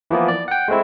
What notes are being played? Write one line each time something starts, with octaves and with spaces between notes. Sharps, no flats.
E3 F3 A#3 B3
D5
F#5 G5
G#3 A3 C4 E4